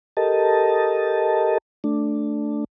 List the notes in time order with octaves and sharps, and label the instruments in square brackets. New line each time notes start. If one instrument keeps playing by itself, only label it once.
[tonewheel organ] G4 A4 A#4 D#5 A5
A3 D4